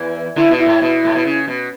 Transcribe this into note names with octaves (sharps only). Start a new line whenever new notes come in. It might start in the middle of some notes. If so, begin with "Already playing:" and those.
Already playing: E2 E3
D3 E4
B2
E4
A2
B2
A2
B2
C#3
B2